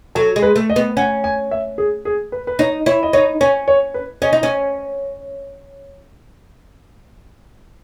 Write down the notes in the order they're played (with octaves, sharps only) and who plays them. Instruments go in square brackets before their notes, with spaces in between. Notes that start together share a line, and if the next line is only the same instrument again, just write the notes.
[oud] F#3 [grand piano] A4
[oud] G#3
[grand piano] B4
[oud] A3
[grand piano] D#5
[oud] B3
[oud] C#4 [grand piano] F#5
[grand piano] G#5
E5
G#4
G#4
B4
B4
[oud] D#4 [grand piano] C#5
[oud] E4 [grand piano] C#5
[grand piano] D#5
[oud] D#4 [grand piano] C#5
[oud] C#4 [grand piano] C#5
[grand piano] C#5
B4
[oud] C#4 [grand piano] D#5
[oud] D#4
C#4